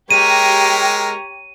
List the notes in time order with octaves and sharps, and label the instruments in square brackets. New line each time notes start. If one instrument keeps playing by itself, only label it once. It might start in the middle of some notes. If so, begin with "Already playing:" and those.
[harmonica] G#3 A#4 [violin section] G4 [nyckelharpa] C#5 A#5 [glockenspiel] D#7